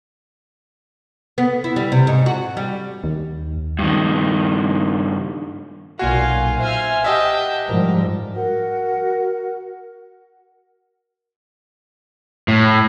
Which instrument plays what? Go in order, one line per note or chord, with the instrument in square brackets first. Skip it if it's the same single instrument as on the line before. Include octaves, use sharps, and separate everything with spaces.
[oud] B3
E4
G3
C3
G#2
F#4
G3
[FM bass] D#2
[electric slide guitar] G2 D#3
[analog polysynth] B1 A#2 G#5 [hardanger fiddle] F4 F5 [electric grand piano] F#4
[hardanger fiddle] C5 G#5 [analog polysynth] E5 F6
[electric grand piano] G4 D#5 E5 [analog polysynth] F#5 [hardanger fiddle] G5 A5
[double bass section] G#2 F3 G3 [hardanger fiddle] A#4
[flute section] F#4 A#4 F#5
[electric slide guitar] A2